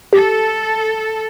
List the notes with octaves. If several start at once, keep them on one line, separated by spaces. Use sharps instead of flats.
G4 A4